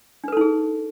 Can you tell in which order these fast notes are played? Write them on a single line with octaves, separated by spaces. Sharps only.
D4 B4 A4 D#4 G#4